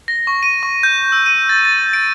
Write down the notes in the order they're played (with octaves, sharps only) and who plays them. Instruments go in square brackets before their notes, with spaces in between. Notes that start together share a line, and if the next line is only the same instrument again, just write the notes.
[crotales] A#6
C#6
D#7
C#6
G6
E6
D#7
A6
A6
D7